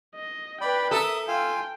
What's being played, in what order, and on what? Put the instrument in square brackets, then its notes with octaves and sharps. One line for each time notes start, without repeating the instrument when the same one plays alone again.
[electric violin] D#5
[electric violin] B4 G5 [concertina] D5 B5
[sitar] A4 [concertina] A#4 D#6 [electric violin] E5
[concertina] F4 F5 G#5 [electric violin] G5